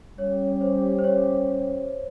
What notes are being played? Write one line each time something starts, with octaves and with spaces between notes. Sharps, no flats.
G3 C#4 G4 C#5
C5
C5
C#5